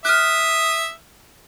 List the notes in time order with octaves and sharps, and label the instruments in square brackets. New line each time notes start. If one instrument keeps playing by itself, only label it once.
[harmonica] E5 D#6 [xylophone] F6 F#6